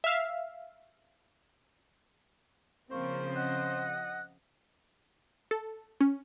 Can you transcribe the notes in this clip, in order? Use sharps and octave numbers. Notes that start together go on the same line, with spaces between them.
E5 F5
C#3 F3 A#3 C4 C5 C#6
D#5 F#5 F#6
A4
C#4